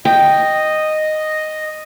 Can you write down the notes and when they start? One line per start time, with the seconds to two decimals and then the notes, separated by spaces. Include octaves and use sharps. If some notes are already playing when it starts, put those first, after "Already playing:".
0.05 D#5 G5